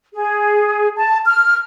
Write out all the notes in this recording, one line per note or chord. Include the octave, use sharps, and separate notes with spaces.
G#4
A5
F6